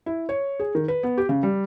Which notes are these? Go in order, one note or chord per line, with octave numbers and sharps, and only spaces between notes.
E4
C#5
G#4
D#3
B4
B3
G4
C#3
G3